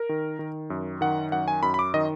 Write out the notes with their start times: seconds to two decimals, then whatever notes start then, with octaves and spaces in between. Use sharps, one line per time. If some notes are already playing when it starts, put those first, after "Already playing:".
Already playing: A#4
0.09 D#3
0.39 D#3
0.70 F#2
1.01 D#3 F#5
1.32 F#2 F#5
1.48 G#5
1.63 F#2 B5
1.74 B5
1.79 D6
1.94 D#3 D#5